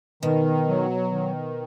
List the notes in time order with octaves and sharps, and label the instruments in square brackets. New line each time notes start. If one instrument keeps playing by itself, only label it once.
[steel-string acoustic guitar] B2 [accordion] D#3
[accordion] F#3
D#3